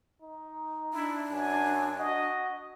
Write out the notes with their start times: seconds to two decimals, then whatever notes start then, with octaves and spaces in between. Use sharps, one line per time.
0.22 D#4
0.93 D4 E4
1.31 F#2 G#5
1.98 F#4 D#5